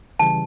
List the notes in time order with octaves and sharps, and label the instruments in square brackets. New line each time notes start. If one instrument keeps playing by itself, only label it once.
[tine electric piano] C#3 E3 G3 [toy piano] A5